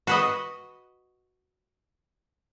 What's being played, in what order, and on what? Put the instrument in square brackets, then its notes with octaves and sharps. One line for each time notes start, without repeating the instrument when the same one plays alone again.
[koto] F#4 B4 D#5